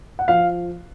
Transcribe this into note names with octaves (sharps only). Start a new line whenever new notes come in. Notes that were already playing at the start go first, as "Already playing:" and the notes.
F#5
F3 F5